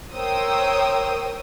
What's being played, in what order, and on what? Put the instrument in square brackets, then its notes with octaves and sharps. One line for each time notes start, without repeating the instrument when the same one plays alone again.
[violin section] A#4 C5 C#5 G5 D#6 E6